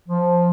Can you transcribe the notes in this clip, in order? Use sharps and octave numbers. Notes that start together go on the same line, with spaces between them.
F3